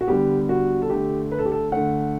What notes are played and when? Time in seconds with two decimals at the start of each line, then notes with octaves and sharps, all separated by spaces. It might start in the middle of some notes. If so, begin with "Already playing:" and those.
0.01 F#4
0.08 D3 G3 B3 G4
0.49 F#4
0.82 A4
0.90 D3 A3 G4
1.32 B4
1.39 A4
1.46 G4
1.52 A4
1.72 D3 A3 F#5